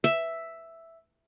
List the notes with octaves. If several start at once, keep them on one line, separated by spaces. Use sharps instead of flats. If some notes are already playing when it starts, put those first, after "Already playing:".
E5